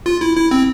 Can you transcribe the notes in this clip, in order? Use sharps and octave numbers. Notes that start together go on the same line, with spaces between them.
F4
E4
E4
C4